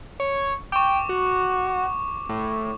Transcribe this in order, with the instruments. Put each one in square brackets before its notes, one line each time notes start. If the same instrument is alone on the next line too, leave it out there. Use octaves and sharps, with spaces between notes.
[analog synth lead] C#5
[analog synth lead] G5 [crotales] C#6 D6
[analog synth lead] F#4
A2